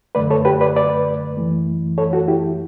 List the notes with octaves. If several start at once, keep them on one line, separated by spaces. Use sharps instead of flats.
F#2 D3 A3 B4 D5
A4 C#5
G4 B4
B4 D5
B4 D5
F#2 E3 A3
A4 C#5
F#4 A4
E4 G4